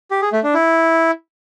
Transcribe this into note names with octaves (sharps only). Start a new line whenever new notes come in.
G4
G#4
A3
D4
E4